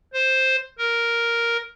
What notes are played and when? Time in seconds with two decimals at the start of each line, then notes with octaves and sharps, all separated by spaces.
0.13 C5
0.78 A#4